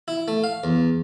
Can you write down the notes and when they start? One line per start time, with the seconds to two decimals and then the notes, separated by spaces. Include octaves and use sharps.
0.08 E4
0.28 A3
0.44 F5
0.64 E2